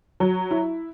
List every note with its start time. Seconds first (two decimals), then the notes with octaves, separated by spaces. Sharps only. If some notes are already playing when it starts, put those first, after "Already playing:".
0.20 F#3
0.51 E4